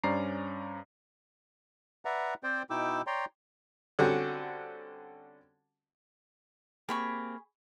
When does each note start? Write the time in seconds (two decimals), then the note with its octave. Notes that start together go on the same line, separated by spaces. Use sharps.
0.04 G2 C#4 C5 D5 A#5 C7
2.05 B4 D5 E5 F#5 A#5
2.43 C4 C5 D5 G5
2.70 B2 D#4 E4 G5 D6 E6
3.07 C#5 D5 G5 A#5 C6
3.99 D3 G3 C4 C#4 F#4
6.89 A#3 C4 G4 G#4 B5 C#6